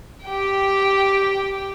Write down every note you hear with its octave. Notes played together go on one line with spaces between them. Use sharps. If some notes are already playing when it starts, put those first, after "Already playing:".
G4 G5